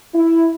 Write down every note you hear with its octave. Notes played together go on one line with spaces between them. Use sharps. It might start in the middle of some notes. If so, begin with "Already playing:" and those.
E4